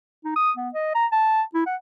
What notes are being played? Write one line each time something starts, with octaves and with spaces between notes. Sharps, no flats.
D#4
D#6
B3
D#5
A#5
A5
E4
F#5